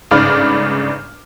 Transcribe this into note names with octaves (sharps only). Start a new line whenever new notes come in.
G1 G#2 C#3 D5 B5 F6